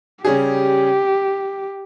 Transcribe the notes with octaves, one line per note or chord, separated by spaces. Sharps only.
C#3 G3 C#4 G4 G#4